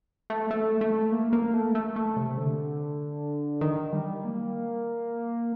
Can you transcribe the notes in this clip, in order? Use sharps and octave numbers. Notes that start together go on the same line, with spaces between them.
A3
A3
A3
A#3
A#3
A3
A3
A3
C3
D3
D#3
G3
A#3